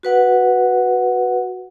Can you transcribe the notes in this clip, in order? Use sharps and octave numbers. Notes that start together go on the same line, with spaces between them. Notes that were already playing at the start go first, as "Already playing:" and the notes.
F#4 B4 F#5